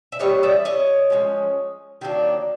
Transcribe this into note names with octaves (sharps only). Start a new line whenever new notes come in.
E5
E3 G3 B3 C#5 D#5
D5 E5
C#5 D#5
F3 G#3 C#4
D#3 F#3 A#3 D4